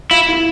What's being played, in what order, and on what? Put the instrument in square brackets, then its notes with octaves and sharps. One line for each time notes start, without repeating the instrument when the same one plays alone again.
[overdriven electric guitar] E4 [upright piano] F4
[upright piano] E4